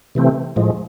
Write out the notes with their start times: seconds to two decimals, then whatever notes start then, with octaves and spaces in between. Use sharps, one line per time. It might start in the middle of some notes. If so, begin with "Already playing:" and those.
0.15 C3 E3 A3 C4
0.56 A2 F3 G#3